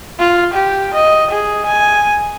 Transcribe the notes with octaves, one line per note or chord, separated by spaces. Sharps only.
F4
G4
D#5
G#4
G#5